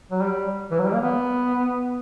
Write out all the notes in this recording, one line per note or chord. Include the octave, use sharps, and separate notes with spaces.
F#3
G3
E3
F#3
G3
A#3
B3